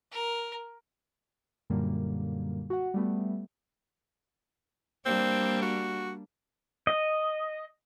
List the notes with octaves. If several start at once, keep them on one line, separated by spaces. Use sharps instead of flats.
A#4
F#2 A#2 D3 G3 A#3
F#4 F#5
G3 A3 B3
G3 A#3 C4 D4
F#4
D#5